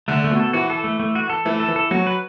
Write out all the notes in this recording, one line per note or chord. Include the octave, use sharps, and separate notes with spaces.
D3 A3
A3
B2
A4
E3 F#4
A4
A3
A3
F#4
A4
E3 A3
A4
E3
A4
F#3 F#4
B4